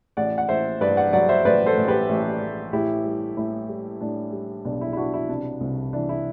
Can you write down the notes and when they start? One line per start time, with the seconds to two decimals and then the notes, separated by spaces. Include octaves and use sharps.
0.17 A1 D5 F#5
0.38 F#5
0.49 A1 C5 E5
0.81 G2 B4 D5
0.97 D5 F#5
1.13 F#3 D5 F#5
1.29 C5 E5
1.45 A1 B4 D5
1.66 A4 C5
1.77 A1
1.88 G4 B4
2.09 A1
2.42 A1
2.73 A2 E4 G4
3.05 G3
3.37 A2 E4
3.69 G3
4.01 A2 D4
4.33 G3
4.65 B1 D4
4.81 E4
4.93 E4
4.97 B3 D4 F#4
5.13 E4
5.29 C3 D4
5.60 C2
5.93 E3 D4
6.09 E4